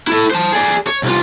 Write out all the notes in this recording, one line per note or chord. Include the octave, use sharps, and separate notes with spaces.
E4 A4
C5 A5
G#4 D5
C#5
C2 F4